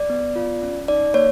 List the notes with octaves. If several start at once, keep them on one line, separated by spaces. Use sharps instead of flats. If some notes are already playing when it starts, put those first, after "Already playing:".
Already playing: D5
B3
F4
C#4
D#4 D5
A#3 C#5